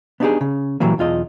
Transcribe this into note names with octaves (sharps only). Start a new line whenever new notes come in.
B3 D4 D#4 F4 G4 G#4
C#3
A#2 E3 F#3 G3 A#3
B1 E2 F4 D#5